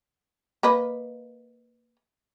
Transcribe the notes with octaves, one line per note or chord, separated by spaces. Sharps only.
A#3 B4 D#5